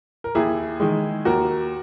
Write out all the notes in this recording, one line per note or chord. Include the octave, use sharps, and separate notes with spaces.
A#4
D#2 E4 G#4
D#3 G#3
D#2 F#4 A#4